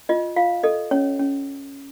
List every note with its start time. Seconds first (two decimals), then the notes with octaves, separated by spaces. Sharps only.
0.09 F4 D#5
0.36 F4 F5
0.63 A4 D#5
0.91 C#4 C#5
1.19 C#4